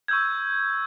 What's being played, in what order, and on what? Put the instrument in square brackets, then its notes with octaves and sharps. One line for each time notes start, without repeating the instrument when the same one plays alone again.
[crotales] C#6 E6 G6 G#6